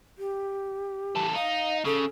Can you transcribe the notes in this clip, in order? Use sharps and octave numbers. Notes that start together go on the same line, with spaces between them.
G4
E2 A4
D#4 F5
C#3 A4